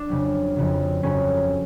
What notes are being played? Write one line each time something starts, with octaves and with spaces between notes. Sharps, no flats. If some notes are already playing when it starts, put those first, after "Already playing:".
Already playing: D4
F2 C#3 F#3
F2 C#3 F#3
G1 F2 C#3 F#3 C#4